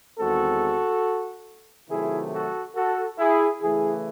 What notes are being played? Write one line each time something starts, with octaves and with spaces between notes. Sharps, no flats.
E2 D#3 G#3 C4 F#4 A4
C3 D#3 F#3 A3 E4 G#4
F#4 A4
F#4 A4
E4 G#4
C#3 E3 A3 E4 G#4